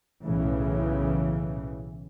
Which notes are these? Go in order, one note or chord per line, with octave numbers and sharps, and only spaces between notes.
B1 A2 C#3 E3